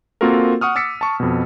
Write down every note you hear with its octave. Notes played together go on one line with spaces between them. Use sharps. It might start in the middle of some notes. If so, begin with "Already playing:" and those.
A#3 C4 F4 F#4 A4 A#4
F#5 C#6 D#6 F6
D6 E6 A6 B6 C#7
A5 C#6
F2 B2